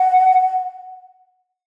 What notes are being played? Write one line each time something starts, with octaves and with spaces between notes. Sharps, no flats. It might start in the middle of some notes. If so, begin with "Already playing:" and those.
Already playing: F#5